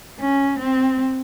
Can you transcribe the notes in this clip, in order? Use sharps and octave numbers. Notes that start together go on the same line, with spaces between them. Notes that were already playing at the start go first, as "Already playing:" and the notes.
C#4
C4